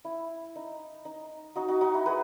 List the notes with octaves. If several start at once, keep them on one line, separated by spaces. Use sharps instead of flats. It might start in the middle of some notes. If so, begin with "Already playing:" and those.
E4
D#4
D#4
D#4 F#4
D#4 F#4
D#4 F#4
E4
G#4 B4